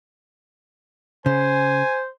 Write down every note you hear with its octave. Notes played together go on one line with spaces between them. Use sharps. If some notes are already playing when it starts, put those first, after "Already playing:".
C#3 C5 G#5